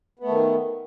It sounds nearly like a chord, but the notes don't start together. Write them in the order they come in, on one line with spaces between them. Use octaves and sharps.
B3 A3 D#3